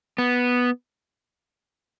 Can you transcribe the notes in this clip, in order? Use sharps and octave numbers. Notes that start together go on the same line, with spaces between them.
B3